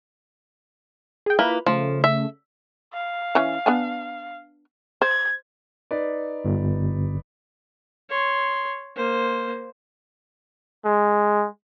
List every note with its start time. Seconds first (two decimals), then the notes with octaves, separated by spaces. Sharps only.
1.26 G#4 G5
1.39 A#3 E4 F4 B4
1.66 C#3 F3 A3
2.04 E5
2.93 F5
3.35 E3 C#4
3.66 B3 D4 G#5
5.02 C5 G#6
5.91 D#4 B4 D5
6.45 G1
8.10 C#5 C6
8.96 A#3 C5
10.85 G#3